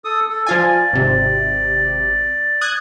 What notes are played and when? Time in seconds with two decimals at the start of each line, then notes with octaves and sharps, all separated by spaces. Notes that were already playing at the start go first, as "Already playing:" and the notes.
0.05 A4 D#6
0.30 A4
0.46 F3 F4 D5 G#5
0.93 G#1 C3
2.61 D#6 F#6 G#6